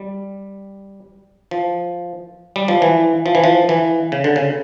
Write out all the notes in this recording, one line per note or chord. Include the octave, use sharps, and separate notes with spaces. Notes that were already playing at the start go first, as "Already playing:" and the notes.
Already playing: G3
F3
G3
F3
E3
F3
E3
F3
E3
C#3
D3
C#3